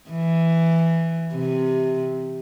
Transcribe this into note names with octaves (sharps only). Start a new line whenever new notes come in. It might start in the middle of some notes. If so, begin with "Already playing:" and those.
E3
C3